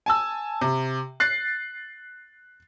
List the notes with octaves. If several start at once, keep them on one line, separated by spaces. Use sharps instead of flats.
G#5 A5 E6
C3
F#6 A6 C7